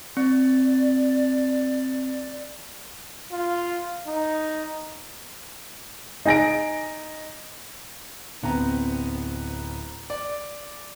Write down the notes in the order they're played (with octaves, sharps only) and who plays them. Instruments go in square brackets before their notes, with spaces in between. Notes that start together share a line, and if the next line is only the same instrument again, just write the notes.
[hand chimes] C4 [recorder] D5
[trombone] F4
D#4
[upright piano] D#4 G#5 A#6 D7
[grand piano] D1 B3 C4 A#5
D5